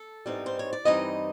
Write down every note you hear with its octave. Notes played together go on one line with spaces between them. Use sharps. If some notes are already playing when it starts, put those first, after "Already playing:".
Already playing: A4
G#2 E3 G3 C4 D#4
C5
C#5
D5
G2 E3 G3 C4 D#4 D#5